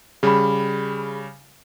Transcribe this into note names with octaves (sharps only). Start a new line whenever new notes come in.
C#3 G3 G#4 B5